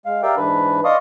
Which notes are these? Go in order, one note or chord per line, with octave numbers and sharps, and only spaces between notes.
G#3 F5
G4 A#4 D5 E5 F5 G5
G#2 E3 D4 B4 B5
D5 D#5 F5 C6 C#6 D#6